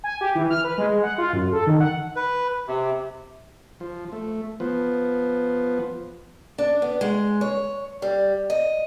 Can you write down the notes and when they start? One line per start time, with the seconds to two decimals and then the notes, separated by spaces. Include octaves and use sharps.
0.04 G#5
0.21 G4
0.35 E3
0.50 F6
0.64 B4
0.78 G#3
1.03 F#5
1.18 F4
1.33 F#2
1.52 A4
1.67 D#3
1.80 F#5
2.16 B4
2.68 C3
3.80 F3
4.12 A3
4.60 F3 B3
6.58 D4
6.82 B3
7.01 G#3
7.41 C#5
8.02 G3
8.50 D#5